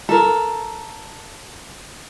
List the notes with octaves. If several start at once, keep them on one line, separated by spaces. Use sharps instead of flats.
A4 A#4